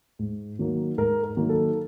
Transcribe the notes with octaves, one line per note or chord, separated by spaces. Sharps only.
G#2
D#3 F#3 A#3
G#2 A#4
A#4
D#3 F#3 A#3
A4